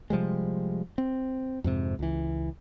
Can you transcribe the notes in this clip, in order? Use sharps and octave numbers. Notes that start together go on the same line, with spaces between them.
C3 F3 G3 G#3
C4
F2 G#2 C3
C#2 E3